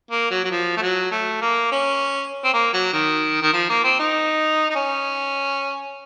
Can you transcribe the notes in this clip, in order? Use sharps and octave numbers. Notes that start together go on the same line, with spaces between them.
A#3
F#3
F#3
F3
A3
F#3
A3
A#3
C#4
C4
A#3
F#3
D#3
D#3
F3
A#3
C4
D#4
D#4
C#4